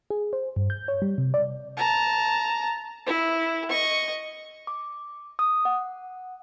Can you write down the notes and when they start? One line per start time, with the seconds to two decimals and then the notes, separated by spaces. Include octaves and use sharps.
0.10 G#4
0.33 C5
0.56 G2
0.70 G6
0.88 C#5
1.02 G3
1.18 C3
1.34 D5
1.77 A5 A#5
3.07 E4
3.69 D#5 C#6
4.67 D6
5.39 D#6
5.65 F#5